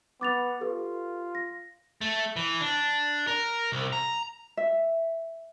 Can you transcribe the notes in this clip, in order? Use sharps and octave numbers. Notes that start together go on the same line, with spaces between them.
B3 D6 A6 F7
F4 G4 A4 B4
A#6
A3
E3
D4
A#4
C2
A#5
E5